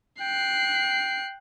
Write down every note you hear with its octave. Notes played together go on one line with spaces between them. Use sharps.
G5 F#6 C7